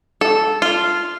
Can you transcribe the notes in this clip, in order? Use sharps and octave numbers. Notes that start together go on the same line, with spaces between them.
A4
F4